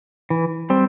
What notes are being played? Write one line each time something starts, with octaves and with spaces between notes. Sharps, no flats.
E3
G3 C4